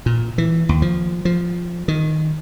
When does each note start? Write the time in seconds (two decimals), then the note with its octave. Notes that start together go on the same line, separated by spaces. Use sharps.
0.06 A#2
0.38 E3
0.69 D#2
0.82 F3
1.25 F3
1.88 D#3